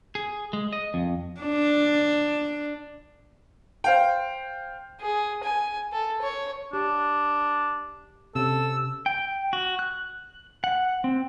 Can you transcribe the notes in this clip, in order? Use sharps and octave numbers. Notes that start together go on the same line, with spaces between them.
G#4
G#3
D#5
F2
D4
C5 F5 G5
G#4
G#5
A4
C#5
D4 G4
C3 C#4 A4 E6
G5
F#4
F#6
F#5
C4